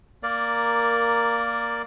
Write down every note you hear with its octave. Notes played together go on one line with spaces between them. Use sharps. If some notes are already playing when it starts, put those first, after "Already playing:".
A#3 A#4 D5